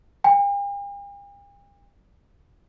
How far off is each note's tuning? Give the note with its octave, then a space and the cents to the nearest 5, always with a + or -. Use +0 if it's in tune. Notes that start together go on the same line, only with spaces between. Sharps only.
G5 +45